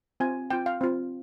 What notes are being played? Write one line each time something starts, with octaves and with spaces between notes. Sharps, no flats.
C4 F4 G#5
C4 F4 G5
F5
C4 F4